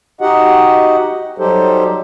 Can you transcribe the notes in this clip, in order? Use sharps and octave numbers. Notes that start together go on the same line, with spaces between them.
D#4 F#4 G4 D#5 F#5
F#3 G3 D#4 G4 A4 C5